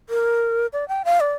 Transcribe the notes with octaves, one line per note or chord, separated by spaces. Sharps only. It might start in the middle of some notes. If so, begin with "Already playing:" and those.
A#4
D5
G5
F5
D5